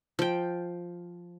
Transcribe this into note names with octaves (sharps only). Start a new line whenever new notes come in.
F3 G5